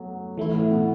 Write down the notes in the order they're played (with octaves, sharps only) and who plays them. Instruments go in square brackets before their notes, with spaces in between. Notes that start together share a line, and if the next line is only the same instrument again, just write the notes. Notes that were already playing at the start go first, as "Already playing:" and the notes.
Already playing: [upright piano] F#3 A3 B3
[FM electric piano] E3 A3 E4
[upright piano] A2
B2